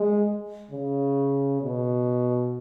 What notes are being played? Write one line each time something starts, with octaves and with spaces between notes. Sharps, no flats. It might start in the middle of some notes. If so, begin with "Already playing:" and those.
Already playing: G#3
C#3
B2